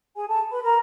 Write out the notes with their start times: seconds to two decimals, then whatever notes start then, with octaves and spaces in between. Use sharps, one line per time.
0.15 G#4 G#5
0.27 A4 A5
0.51 B4 B5
0.63 A#4 A#5